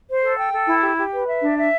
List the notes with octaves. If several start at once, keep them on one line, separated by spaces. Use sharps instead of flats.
C5
A4
G5
A4
E4
G4
G4
B4
E5
D4
E5